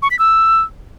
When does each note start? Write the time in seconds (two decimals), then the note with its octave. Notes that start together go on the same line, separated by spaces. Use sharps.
0.02 C#6
0.11 B6
0.19 E6